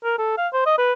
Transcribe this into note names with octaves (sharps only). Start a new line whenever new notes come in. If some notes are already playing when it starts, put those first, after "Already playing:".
A#4
A4
F5
C5
D#5
B4